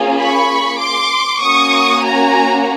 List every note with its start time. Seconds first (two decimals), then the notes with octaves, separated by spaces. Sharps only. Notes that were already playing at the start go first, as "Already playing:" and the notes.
Already playing: A#3 C#4 F4 G#4
0.18 B5 C#6
0.80 C6 D6
1.42 A#3 C#4 F#4 C#6 D#6
2.03 G#5 A#5